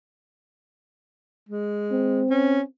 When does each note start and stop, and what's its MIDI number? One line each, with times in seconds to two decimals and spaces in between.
1.49 2.23 56
1.92 2.65 60
2.30 2.61 61